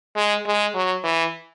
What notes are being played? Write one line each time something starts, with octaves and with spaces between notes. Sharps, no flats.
G#3
G#3
F#3
E3